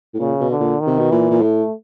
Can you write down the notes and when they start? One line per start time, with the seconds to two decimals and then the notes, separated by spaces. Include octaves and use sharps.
0.14 A2
0.19 A#2 C#3
0.40 B2
0.50 D3
0.60 A#2
0.80 D#3
0.87 C3
0.98 B2
1.11 A#2 E3
1.31 A#2
1.41 A2 A3